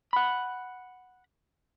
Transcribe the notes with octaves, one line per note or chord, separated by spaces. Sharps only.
F#5 B5